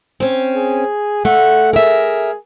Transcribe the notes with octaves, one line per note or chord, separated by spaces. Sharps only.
C4 C#4
G#4
A3 F#5
G#4 A#4 E5